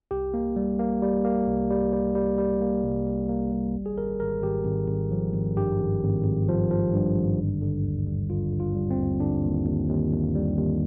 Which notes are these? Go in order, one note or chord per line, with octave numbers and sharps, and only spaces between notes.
C2 G4
A#3
G3
A#3
G3
A#3
C2
G3
G3
G3
G3
A#3
C2
G3
A#3
G3
G#1
G#4
G#1 A#4
G#1 A#4
G#1 G4
G#1
G#1
F3
G#1
G2 G4
G#1
G#1
G#1
F3
F3
G2
G#1
D3
D3
D#2
G3
D3 F4
D3
F4
G3
C4
D#2
D3 D4
D#2
D#2
D#2
D#2
G3
D#2